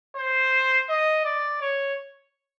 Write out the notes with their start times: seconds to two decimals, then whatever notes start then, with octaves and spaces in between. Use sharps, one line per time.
0.16 C5
0.89 D#5
1.25 D5
1.61 C#5